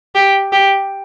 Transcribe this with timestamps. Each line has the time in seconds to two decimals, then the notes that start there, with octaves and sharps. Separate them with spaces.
0.15 G4
0.52 G4